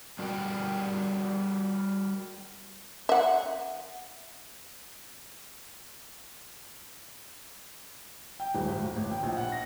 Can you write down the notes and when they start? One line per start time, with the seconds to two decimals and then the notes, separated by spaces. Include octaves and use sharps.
0.19 G3 F#4 A#4 D5 G5
3.09 E5 F#5
8.40 G5
8.55 D#1
8.68 G#1
8.80 D1
8.96 A1
9.11 G5
9.23 A#1
9.37 F#5
9.52 A#6